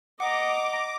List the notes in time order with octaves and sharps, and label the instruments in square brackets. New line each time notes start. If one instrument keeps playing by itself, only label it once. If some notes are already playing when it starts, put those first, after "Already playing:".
[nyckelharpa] D#5 A#5 [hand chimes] F#5 C#7 [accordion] D6